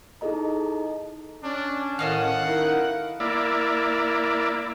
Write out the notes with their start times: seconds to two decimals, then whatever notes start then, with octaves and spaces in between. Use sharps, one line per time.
0.21 D#4 E4 G#4 A4 D#5 A#5
1.43 C#4 D4
1.99 A2 D#3 A4 D#5 F5 F#5
2.47 D#4 E4 A#4
3.20 A#3 E4 D5